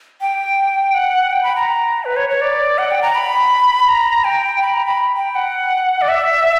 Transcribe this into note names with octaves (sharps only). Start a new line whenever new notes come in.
G5
F#5
G5
B5
A#5
B4
C#5
C#5
D5
F#5
G5
A#5
B5
A#5
G5
B5
A#5
B5
G5
F#5
D5
E5